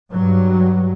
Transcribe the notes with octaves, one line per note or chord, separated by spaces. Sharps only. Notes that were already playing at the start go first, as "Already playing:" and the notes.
G2 F#3